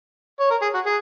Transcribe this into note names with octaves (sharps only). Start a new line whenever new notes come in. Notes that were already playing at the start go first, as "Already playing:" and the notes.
C#5
A#4
G#4
F#4
G#4